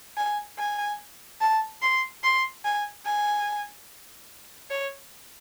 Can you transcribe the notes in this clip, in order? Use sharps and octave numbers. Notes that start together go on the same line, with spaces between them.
G#5
G#5
A5
C6
C6
G#5
G#5
C#5